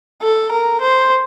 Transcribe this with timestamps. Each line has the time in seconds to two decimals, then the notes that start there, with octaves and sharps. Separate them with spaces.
0.22 A4
0.52 A#4
0.81 C5